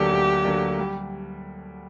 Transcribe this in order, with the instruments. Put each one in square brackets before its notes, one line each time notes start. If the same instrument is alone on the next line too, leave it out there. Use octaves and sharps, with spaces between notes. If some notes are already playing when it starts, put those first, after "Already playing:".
Already playing: [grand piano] D2 D3 F#3 A#3 D4 [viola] G4
[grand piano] D2
D3 F#3 A#3 D4
G3